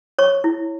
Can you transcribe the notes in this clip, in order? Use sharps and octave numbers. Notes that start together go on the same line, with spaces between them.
C#5 C#6
E4